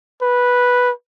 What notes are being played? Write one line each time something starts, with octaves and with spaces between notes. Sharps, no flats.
B4